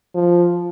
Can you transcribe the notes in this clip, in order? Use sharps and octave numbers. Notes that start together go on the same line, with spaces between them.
F3